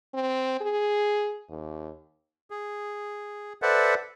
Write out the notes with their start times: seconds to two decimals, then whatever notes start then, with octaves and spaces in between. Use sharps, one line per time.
0.14 C4
0.61 G#4
1.50 D#2
2.51 G#4
3.62 A4 B4 C5 D5 E5 F#5